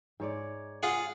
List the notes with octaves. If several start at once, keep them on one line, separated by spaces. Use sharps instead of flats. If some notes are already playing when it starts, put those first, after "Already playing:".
G#2 C#5 D5
F4 G#4 F#5